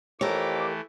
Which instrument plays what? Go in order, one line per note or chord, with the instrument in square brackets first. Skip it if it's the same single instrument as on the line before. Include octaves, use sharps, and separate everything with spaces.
[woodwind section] F2 D6 [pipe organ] E3 A3 [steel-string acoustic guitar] G4 A#4 [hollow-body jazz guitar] C#5